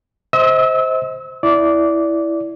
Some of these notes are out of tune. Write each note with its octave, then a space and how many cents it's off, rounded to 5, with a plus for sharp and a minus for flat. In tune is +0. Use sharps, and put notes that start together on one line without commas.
C5 +0 D#5 +40 E6 -25
E4 +0 D5 -15